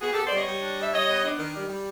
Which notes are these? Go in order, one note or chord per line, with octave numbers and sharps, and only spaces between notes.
B3 F#4 G#4
G4 A4
B3
C5 D5
G3 C#5 D#5
G3
D4
G3 E5
G3 C#5 D#5
B3
D4
D#3
G3
G3